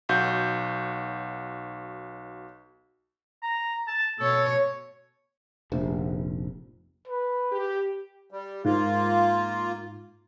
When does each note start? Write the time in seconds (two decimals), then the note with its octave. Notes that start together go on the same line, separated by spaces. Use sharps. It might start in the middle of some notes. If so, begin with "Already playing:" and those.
0.09 B1 F#4 G6
3.42 A#5
3.87 A5
4.19 B2 A4 C#5
5.72 F1 A#1 C3
7.07 B4
7.52 G4
8.31 G3
8.65 G#2 A#3 F4